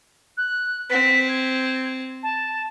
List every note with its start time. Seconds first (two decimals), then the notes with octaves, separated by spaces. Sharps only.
0.37 F#6
0.90 C4 B6
1.28 G#6
2.23 A5